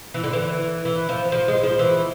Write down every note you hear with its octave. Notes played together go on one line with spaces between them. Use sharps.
E3
D3
E3
E3
F3
F3
G#3
F3
E3